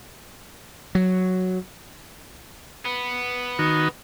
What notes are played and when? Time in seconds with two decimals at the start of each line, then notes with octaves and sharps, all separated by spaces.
0.95 F#3
2.85 B3
3.59 D#3 D#4 F#4